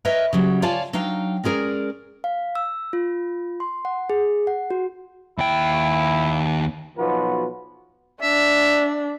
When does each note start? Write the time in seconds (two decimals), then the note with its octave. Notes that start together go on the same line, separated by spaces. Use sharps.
0.05 A#4 B4 C#5 D#5 E5
0.33 C#3 F#3 G3
0.62 F4 C#5 D5 F5 G#5 A5
0.93 F#3 D4 D#4 F5 G5
1.44 G#3 C#4 G#4 A#4 D5
2.24 F5
2.55 E6
2.93 F4
3.60 C6
3.85 F#5
4.10 G#4
4.47 F#5
4.70 F#4
5.38 D#2 E4 G5
6.97 B1 B2 F3 F#4 B4
8.22 D4 E5